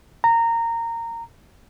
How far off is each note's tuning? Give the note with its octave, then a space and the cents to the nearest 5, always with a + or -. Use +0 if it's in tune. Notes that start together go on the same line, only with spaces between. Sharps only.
A#5 -15